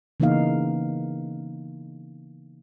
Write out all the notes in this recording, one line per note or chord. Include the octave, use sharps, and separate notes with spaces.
C#3 E3 A#3 B3 D#4 F5